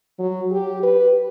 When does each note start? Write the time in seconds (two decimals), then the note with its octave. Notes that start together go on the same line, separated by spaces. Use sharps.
0.19 F#3
0.52 G4
0.83 B4